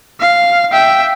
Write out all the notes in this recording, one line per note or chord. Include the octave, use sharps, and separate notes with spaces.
F5
E5 G5